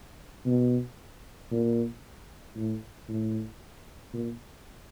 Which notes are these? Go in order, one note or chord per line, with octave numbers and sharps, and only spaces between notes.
B2
A#2
A2
A2
A#2